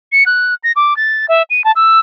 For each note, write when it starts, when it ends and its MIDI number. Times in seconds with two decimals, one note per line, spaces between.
0.12 0.24 97
0.26 0.54 90
0.64 0.72 94
0.76 0.96 86
0.97 1.26 93
1.29 1.43 76
1.50 1.64 99
1.64 1.72 81
1.76 2.00 88